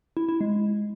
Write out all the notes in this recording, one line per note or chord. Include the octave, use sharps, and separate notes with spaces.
E4
E4
G#3